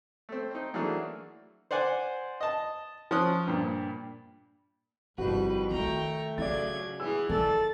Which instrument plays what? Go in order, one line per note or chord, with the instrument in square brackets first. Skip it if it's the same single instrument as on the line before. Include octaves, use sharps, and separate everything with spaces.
[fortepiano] A3 C4
C4 D#4
E3 F#3 A3 A#3 D4 G#4
C5 D5 F#5 G#5
D#5 A5
F3 C#4 D#6 F#6
G2 A#2
[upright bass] G1 [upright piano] C2 F#4 [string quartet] F2 B4 [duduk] G3
[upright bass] D#3 F4 [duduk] A3 [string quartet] G5 A#5 C#6
[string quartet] C#3 F#3 G#6 [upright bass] F4 [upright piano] D5 A6
[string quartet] E3 B3 [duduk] G#4 [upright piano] E6
[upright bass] D#3 [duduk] A4 [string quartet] D5 A6